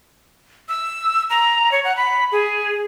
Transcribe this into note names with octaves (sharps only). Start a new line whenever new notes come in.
E6
A#5
C#5
F#5
B5
G#4